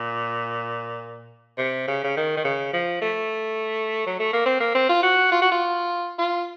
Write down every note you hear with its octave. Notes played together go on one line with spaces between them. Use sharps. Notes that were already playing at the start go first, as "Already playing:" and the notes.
Already playing: A#2
C3
C#3
C#3
D#3
D#3
C#3
F3
A3
F#3
A3
A#3
C4
A#3
C4
F4
F#4
F4
F#4
F4
F4